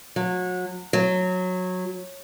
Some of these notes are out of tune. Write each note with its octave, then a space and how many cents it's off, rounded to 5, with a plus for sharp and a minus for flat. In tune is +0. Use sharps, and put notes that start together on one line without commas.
F#3 -30
F#3 -15